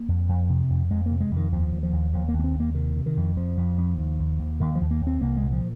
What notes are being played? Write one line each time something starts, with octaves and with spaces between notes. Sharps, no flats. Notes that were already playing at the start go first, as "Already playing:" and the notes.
Already playing: A#3
F2
F2
C3
F2
F2 G#3
C3 A#3
G#3
F2
D#3
D#2 F3
D#2
F3
D#2
D#2 F3
A#3
D#2
A#3
C4
D#2
A#3
C3 D#3
C3
D#3
F2
F2 F3
F2
F2
D#2
D#2
D#2
D#2 D#3
F3
D#2
A#3
D#2
C4
C2 A#3
G#3
A#2
F3